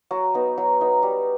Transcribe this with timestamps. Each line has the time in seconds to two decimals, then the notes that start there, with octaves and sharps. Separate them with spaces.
0.11 F#3 F#4
0.34 B3 D#4
0.58 F#3
0.81 B3 D#4
1.03 G3